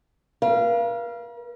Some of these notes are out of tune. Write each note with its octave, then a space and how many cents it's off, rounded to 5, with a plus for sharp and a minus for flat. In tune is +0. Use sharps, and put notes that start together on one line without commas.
A#4 +45 F5 -25